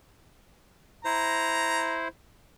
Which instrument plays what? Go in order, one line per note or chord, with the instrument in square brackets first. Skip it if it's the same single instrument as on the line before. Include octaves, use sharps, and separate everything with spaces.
[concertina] E4 C5 [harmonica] A#5